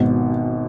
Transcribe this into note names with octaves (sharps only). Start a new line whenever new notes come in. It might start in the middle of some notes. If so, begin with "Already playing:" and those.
Already playing: G#1 B2